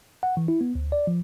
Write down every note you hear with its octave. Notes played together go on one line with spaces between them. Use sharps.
F#5
E3
E4
B3
D2
D5
F3